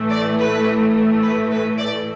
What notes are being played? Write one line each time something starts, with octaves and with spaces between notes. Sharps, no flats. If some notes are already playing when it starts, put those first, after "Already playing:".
Already playing: A2 E3 A3
D5
B4
B4
B4
D5